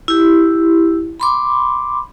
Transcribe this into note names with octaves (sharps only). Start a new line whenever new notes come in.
E4 G4
B5 C6 D6